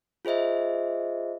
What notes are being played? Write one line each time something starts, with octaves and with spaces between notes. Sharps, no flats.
F4 G#4 C5 D#5 E5